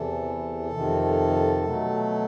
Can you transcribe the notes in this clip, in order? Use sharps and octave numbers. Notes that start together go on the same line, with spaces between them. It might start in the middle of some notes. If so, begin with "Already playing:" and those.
Already playing: E2 C3 E3 A4
F2 C3 D#3
B2 F#3 A3